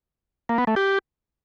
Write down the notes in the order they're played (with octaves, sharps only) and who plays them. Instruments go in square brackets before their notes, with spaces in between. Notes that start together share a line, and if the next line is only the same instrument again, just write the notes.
[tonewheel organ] A#3
B3
A3
G4